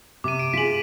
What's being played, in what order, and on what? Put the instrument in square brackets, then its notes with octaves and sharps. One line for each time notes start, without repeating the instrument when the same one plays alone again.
[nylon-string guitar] C3 [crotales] D6 D#7
[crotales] D7
[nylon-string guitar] F4 G#4 [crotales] B6 F#7